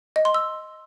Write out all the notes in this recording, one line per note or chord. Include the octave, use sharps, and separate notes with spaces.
D#5
C6
E6